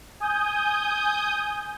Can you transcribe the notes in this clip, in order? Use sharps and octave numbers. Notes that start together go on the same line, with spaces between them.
G#5 D#6 G6